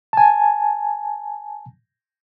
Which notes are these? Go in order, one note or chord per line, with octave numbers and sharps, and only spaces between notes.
G#5 A5